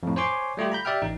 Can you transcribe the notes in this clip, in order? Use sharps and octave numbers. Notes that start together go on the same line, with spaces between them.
F2 A2
C5 C#5 G#5 C6 D6
G3 A3 F4 G4
A#5 B5 G6
G4 D5 E5 G5 F6
A1 D#4